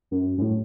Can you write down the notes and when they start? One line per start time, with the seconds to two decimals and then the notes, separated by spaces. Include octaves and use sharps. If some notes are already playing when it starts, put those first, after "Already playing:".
0.11 F#2
0.38 F#2
0.42 A2